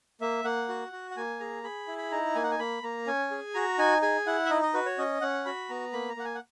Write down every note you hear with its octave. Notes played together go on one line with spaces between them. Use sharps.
A#3 E5
A#3 F#5
F#4
F#4
F#5
A#3 G#5
G#4 A#5
G#4 B5
E4
B5
D#4 A#5
A#3 G#5
F#5
G#5
A#3 B5
A#3 A#5
C#4 G#5
G#4
F#4 A#5
D#4 G#5
G#4 G#5
E4 F#5
E5
D#4 D#5
D#5
F#4 B4
C#5
C#4 D#5
C#4 F#5
F#4 B5
B3 A#5
A#3 B5
A#5
A#3 F#5
G#5
F#5